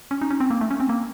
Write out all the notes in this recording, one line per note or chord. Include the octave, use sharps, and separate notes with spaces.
C#4
D#4
C#4
C4
A#3
A3
C#4
C4
A#3